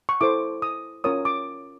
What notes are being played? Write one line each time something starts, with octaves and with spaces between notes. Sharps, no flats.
C#6
E4 A4 C5 D6
D#6
C#4 F4 A#4 C#5 D#6
D6